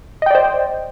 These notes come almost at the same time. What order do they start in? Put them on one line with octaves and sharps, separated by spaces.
D#5 G5 D5 C5